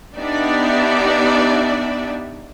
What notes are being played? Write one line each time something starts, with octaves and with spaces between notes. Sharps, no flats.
B3 D4 D#4 G4 D5 E5